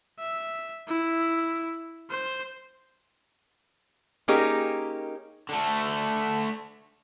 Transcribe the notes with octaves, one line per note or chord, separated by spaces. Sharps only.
E5
E4
C5
A#3 C#4 D#4 G4 G#4 A#4
D3 A3